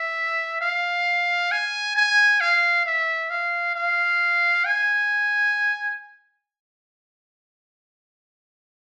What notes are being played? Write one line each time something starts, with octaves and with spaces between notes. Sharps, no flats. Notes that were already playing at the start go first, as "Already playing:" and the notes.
Already playing: E5
F5
G#5
G#5
F5
E5
F5
F5
G#5